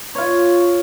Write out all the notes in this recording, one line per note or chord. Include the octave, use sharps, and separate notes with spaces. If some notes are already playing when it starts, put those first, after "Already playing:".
F4 C#5